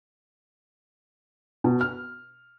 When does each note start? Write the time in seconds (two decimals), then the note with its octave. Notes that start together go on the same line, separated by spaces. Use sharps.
1.64 B2
1.81 F6